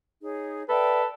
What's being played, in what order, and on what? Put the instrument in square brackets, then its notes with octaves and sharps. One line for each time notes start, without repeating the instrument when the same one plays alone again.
[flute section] D#4 G#4 C#5
[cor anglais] A4 [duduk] B4 [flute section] D5 E5 G5